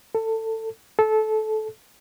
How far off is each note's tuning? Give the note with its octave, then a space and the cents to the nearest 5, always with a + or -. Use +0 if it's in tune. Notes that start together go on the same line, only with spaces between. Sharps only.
A4 +20
A4 -20